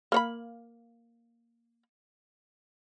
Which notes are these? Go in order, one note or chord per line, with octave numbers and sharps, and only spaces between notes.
A#3 C#5 B5